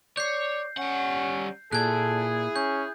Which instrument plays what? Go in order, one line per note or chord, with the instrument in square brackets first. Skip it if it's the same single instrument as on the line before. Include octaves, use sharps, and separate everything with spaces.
[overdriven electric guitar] C#5 [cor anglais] D5 [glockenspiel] G6 C7
[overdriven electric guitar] G3 F#5 [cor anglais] C#4
[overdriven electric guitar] A#2 [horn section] E4 G#4 [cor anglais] A4 [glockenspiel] F#6 G#6
[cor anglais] C#4 [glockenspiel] G6